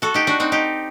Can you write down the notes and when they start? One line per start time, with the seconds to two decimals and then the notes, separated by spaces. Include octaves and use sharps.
0.02 F#4 A4
0.14 D#4 G4
0.27 D4 F#4
0.40 C4 D#4
0.52 D#4 G4